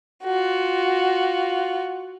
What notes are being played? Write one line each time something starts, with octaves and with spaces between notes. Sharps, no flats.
F4 F#4